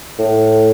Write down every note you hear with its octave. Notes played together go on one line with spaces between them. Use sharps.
A2